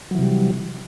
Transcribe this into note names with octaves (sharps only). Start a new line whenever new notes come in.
C3 E3 F#3 G3